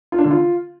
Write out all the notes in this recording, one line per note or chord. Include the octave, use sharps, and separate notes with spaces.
F4
D4
D3
F4